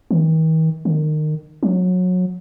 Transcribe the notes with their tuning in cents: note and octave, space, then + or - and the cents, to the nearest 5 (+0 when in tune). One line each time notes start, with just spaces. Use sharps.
D#3 +45
D#3 -25
F#3 -25